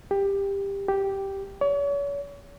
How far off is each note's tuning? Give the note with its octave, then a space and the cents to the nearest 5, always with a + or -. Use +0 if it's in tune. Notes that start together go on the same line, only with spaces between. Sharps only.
G4 +15
G4 -5
C#5 +40